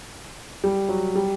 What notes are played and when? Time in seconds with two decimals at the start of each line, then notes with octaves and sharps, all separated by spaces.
0.64 G3
0.89 F#3
1.15 G3